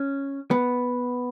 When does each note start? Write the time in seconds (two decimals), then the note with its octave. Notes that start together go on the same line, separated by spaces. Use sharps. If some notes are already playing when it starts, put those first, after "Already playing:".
Already playing: C#4
0.51 B3